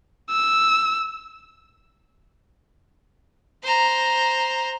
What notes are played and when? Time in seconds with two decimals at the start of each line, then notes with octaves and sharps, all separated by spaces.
0.30 E6
3.63 C5 A#5